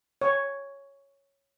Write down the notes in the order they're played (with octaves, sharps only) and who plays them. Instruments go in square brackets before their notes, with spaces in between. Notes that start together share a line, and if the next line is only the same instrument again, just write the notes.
[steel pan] C#5